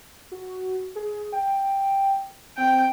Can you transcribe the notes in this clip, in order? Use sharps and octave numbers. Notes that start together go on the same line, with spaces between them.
F#4
G#4
G5
C4 G5